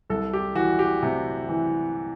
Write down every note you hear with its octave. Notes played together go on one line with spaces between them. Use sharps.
C2 A4
G4
E3 F#4
G4
C3
E3